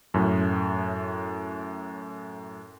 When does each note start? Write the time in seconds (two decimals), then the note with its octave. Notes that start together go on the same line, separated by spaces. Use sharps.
0.14 F#2 A2